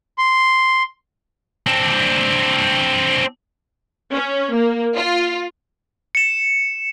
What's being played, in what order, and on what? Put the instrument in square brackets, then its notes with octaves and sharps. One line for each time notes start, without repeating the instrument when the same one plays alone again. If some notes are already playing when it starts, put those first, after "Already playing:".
[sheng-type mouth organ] C6
[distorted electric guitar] C4 D4
[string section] C#4
A#3
F4
[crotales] C#7 E7